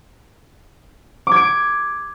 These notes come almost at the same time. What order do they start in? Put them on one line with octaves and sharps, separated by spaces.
D6 G#6 D7